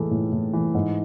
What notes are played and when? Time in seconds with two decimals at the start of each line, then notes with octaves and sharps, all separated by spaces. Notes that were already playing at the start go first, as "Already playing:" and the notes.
Already playing: A2 E3 G#3 A4
0.11 A2
0.32 A2
0.53 E3
0.75 G#2